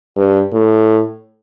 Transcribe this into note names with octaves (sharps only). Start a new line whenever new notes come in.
G2
A2